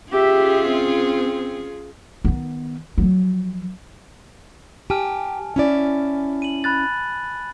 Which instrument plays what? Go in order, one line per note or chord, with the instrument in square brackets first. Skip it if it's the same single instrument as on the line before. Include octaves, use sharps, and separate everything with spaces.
[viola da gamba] C#4 F4 G#4 [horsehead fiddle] G4 E5
[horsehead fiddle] C4
[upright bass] D#3 B3
F3 F#3
[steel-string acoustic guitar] G4 [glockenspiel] G#5 A5 F6
[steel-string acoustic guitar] C#4 E4 D5
[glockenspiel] D#7 F#7
B5 F#6 A6